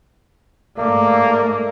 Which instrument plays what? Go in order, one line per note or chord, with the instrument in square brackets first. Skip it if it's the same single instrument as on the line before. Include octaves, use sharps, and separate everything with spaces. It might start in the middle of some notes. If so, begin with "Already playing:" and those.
[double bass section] G#2 A3 [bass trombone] A#3 [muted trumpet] D5